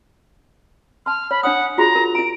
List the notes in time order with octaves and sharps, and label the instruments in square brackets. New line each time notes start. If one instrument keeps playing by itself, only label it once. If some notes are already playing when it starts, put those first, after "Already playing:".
[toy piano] A5 C6 [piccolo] F6
[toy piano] C#5 [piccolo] B5
[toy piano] D4 C#5 D#6 [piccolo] F#5
[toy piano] F4 F#4 G#4 [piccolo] A#5
[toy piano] A#4
[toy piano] E4 A#5 [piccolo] D7